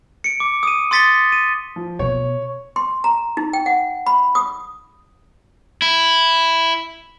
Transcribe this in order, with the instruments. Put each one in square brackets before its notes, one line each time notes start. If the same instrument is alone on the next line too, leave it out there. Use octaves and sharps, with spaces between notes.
[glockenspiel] C#7 D7
D6
D#6 D#7
C6 D#6 A6 B6 C#7 G7
D#7
[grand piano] F3
[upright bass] B2 B3 [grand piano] C#5
[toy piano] C6
A#5
D#4
G5
F#5
B5
D#6
[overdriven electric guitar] E4